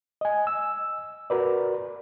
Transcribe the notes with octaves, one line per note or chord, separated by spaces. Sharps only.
D#5 G#5
E6
F#4 A#4 B4 D5